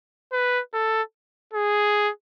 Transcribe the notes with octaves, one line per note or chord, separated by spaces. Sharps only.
B4
A4
G#4